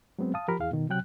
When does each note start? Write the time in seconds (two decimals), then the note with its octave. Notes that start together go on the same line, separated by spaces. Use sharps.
0.19 F#3 G#3 B3 C4
0.34 F5 A5 D#6
0.48 F3 G4 A#4 B5
0.59 E2 E4 G#4 F5
0.71 B2 D#3
0.89 C3 F#3 G5 F#6